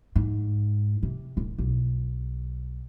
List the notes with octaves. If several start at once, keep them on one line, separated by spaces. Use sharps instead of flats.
G#2
C3
D1
B1